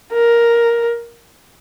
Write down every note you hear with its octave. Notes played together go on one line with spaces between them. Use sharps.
A#4